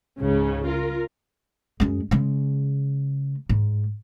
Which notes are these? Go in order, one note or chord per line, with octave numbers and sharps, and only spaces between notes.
C#2 G#2 C#3
F4 A#4
F#2 G#3
C#3 G#3
G#2